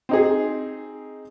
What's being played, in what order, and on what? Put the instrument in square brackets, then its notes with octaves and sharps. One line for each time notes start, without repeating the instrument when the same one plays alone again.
[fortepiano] C4 D#4 G#4